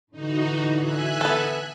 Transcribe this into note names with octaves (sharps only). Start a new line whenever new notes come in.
A2 D3 E3 D#4 F#4
E5 G#5 F#6
B3 A4